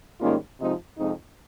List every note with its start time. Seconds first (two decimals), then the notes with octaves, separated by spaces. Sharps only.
0.21 G#2 D#3 G3 A#3 C#4 F4
0.59 C3 F3 G#3 C4 D#4
0.98 F2 C3 F3 G#3 C4 D#4